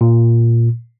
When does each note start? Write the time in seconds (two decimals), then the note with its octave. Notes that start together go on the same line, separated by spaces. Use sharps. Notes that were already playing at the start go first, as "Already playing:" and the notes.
0.01 A#2